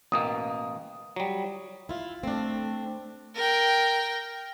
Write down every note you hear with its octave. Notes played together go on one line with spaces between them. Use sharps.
A1 B2 A#3 D#6
F#3 G3
E4 F4
A3 C4 D4
A#4 G5